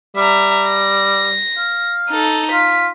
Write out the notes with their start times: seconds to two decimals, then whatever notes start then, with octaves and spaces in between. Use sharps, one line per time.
0.16 G3 E5 A#5
0.68 A#6
1.57 F5
2.10 D#4 A4
2.52 F4 B6